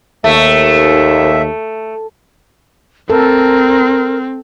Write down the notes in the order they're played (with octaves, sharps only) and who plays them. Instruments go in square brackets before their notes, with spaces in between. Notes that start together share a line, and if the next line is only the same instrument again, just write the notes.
[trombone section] D#2 [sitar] A3 [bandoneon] E5
[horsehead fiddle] C4 [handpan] A4 [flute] A#4